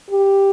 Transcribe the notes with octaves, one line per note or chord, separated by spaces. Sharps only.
G4